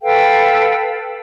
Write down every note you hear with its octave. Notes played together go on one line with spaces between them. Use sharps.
A4 B4 F5 G5